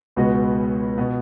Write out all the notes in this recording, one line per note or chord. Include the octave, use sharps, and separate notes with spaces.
C#2 B2 G#3 B3 F#4
B2 B3